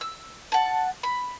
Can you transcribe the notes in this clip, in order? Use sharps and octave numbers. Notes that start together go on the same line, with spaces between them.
E6
F#5 A5
B5